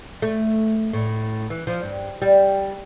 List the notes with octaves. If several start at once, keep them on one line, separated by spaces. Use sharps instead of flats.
A3
A2
E3
F3
G2
G3